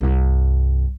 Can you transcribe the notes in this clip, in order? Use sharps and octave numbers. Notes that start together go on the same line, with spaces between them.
C2 G2